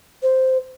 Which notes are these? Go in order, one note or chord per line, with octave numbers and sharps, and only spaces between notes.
C5